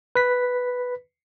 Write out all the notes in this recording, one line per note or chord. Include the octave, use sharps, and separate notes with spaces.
B4 B6